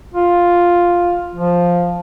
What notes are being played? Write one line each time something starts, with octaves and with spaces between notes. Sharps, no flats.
F4
F3